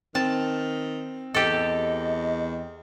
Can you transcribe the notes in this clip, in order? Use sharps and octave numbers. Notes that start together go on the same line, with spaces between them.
D#3 C4 A5
E2 G4 A4 D#5